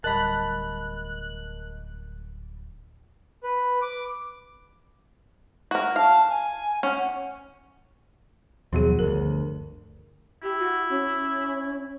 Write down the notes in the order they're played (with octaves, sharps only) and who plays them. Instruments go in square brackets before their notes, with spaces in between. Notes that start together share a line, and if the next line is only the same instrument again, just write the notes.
[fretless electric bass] D1 G3 [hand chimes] A#4 D#5 [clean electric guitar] A5 B5 [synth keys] F#6
[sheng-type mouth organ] B4
D6
[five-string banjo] F#4 A#4
[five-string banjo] F5 [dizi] A5
[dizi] G#5
[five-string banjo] C#4 [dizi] F#5
[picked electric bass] D#2 B2 F#3 [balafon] F3 G#4
[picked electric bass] G1 D2 [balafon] A#4
[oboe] E4 [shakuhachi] G4
[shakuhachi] F#4
C#4